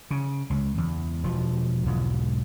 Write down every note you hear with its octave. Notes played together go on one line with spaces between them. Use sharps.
C#3
C#2
E2
E1 F3
B1 E2 G#2